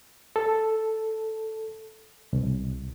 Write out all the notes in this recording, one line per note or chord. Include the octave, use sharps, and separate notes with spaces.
A4
C2